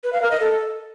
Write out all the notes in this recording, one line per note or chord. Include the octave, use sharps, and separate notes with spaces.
B4
F5
A#4
D#5
A4